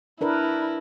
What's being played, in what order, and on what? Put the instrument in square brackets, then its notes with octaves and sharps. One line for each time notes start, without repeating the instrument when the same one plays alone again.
[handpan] D4 A#4 B4 [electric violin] E4